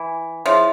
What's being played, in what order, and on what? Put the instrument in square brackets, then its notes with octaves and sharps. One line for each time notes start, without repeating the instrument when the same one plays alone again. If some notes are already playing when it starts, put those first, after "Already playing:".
Already playing: [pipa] E3
[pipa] F3 [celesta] E4 G#4 C#5 E5